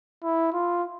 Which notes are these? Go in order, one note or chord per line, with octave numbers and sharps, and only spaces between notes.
E4
F4